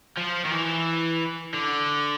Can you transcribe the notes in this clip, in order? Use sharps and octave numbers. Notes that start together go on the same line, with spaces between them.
F3
D#3
E3
D3